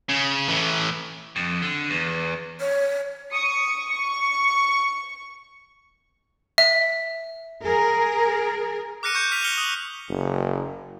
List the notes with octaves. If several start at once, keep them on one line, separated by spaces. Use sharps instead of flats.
C#3
A2 E3
F2
D3
E2
C#5
C#6 D#6 C#7
C#6
E5
G#4 A#4
D6 F6 F#6 A#6 C#7 D#7
C#6 G6 C#7
F6 B6 D#7 F7
F6 C#7 G7
D#6
F#1